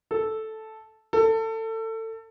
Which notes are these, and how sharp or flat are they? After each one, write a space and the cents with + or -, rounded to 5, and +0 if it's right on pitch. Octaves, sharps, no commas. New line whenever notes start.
A4 -5
A4 +25